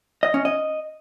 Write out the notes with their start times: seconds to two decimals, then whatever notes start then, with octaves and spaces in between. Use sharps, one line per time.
0.23 D#5
0.34 C#4
0.45 D#5